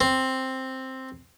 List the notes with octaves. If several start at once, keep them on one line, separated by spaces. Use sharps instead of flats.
C4